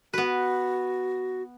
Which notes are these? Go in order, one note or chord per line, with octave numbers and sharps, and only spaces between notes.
B3 F#4 B4